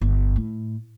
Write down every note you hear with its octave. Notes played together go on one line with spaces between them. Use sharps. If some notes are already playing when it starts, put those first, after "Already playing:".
G1
A2